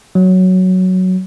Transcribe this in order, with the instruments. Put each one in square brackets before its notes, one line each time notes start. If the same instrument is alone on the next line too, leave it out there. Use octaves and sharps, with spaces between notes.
[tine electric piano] F#3